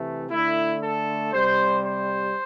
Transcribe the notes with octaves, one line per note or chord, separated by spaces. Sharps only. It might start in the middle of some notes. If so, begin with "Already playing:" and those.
Already playing: C3 E3 A3
D3 A3 E4
A4
C3 G3 C5
C5